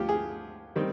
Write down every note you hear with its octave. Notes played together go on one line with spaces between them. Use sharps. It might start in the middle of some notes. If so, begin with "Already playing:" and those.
Already playing: D2 F3 F4 G4
G#4
D#3 G3 C4